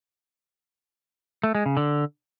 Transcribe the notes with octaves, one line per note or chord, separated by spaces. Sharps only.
A3
G#3
C#3
D3